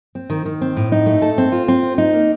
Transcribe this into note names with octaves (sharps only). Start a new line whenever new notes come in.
C4
D#3
D#3
C4
A2
D#4
A3
A4
C4
F4
C4
F4
D#4
A#3